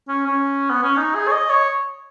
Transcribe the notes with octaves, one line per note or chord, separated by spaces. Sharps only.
C#4
C#4
B3
C#4
D#4
G#4
C#5
D#5
C#5